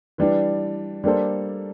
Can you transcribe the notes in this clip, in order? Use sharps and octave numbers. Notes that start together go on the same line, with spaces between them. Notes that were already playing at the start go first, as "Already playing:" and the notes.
E3 G3 D4
G3 A#3 D4 A4 C5